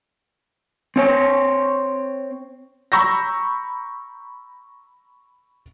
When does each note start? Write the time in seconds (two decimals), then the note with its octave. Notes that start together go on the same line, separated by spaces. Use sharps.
0.96 C4 C#5
2.92 A#5 B5 C#6 E6 G6 A#6